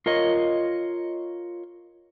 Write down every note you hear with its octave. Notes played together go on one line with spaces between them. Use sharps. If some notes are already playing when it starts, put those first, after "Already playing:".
F4 A#4 C#5 D#5